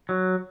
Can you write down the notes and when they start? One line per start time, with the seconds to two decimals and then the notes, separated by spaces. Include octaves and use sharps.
0.09 F#3